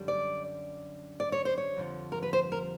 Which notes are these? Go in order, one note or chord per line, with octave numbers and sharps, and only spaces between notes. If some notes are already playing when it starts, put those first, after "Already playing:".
Already playing: F#2 D3 G3
D5
D5
C#5
C5
C#5
F2 D3 F3
A#4
B4
C5
A#4